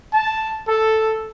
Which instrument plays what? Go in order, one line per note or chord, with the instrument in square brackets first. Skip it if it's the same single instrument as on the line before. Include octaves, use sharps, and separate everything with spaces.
[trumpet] A5
A4